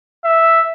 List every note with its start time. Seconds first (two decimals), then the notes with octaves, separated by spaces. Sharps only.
0.24 E5